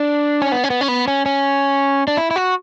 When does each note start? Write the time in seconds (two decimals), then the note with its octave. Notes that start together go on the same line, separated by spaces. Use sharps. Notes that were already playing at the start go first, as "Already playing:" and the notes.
Already playing: D4
0.42 C#4
0.52 B3
0.64 C#4
0.70 B3
0.81 C#4
0.88 B3
1.08 C#4
1.26 C#4
2.08 D4
2.17 E4
2.31 E4
2.36 F#4